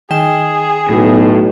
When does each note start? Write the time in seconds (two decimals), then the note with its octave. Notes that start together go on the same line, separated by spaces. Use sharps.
0.10 D#3 G#4 G5 E7
0.89 B1 A2